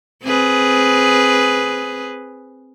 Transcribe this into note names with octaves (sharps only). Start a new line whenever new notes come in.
C4 G#4 B4